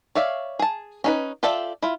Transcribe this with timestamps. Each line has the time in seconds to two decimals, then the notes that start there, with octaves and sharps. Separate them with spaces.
0.15 C#5 D5 E5 F5
0.59 G#4 A5
1.04 C#4 D#4 B4
1.43 F4 G4 A4 D5 E5
1.82 E4 F4